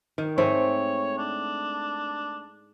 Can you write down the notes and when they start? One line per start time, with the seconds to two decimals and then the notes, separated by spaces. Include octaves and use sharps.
0.18 D#3
0.38 G#2 A3 C4 C#5
1.18 D4